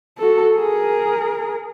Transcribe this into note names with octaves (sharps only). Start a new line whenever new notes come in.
F#4 A4
G#4 A#4